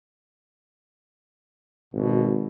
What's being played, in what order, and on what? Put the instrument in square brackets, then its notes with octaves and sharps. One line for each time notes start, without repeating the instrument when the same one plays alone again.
[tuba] G#1 [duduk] B2